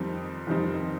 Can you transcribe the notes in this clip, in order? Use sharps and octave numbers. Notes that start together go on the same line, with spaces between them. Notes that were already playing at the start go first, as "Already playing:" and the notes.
Already playing: F2 D#3 G3 C4 D#4
F2 D#3 G3 C4 D#4